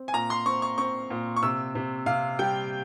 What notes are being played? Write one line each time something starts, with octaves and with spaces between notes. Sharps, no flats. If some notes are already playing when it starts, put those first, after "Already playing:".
Already playing: C4
G#5
A#2 A#5
C6
C4 C#6
C#6
C4 C#6
A#2
C#6
C3 E6
C3
C3 F5
G3 G5